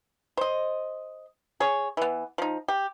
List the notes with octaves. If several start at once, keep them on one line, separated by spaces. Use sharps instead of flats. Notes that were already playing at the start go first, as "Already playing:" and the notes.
C5 D#5
G#4 C#5
E3 B3
F3 D#4
G4